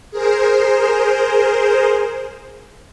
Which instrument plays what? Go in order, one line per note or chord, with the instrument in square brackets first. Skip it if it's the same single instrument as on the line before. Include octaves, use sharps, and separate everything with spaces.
[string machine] G#4 A#4 C5